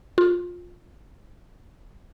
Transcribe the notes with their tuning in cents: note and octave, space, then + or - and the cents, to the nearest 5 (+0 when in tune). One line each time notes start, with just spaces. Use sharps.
F4 +20